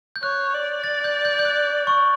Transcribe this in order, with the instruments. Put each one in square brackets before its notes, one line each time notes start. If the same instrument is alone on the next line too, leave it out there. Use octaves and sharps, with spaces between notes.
[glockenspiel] G6
[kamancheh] C#5 [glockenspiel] F#6
[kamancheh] D5
[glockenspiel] A6
G6
G6
G6
F#6
C#6